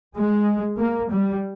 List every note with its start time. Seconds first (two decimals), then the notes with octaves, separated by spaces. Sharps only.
0.15 G#3
0.78 A#3
1.11 G3